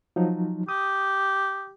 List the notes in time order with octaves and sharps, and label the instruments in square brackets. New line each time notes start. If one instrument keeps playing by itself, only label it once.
[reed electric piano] F3 F#3 D#4
[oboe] G4 [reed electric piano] D#6